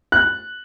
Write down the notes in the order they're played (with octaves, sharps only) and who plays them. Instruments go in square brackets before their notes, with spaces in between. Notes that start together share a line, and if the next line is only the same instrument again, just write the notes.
[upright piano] F#6